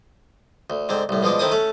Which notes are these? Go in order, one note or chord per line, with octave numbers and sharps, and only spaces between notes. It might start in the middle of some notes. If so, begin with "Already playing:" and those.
D2
G#2 D3 C4
C2 A2
B2 F3 G#3 D4
D#3 C4 E4 A4 C5 D#6
A3 C#4 A4